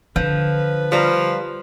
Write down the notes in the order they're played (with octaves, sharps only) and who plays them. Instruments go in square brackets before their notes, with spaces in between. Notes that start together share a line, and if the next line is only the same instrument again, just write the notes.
[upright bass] D3 [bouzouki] F3 [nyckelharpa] B4
[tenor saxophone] F3 [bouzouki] G3 F5 A#5